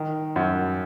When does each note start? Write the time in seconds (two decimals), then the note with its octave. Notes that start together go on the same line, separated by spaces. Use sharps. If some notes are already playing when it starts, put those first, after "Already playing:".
Already playing: D#3
0.36 F#2